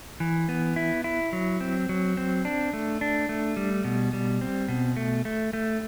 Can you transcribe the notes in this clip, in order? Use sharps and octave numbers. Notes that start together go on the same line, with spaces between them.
E3
B3
E4
E4
F#3
C4
F#3
C4
D4
A3
D4
A3
G3
B2
G3
C4
B2
A3
A3
A3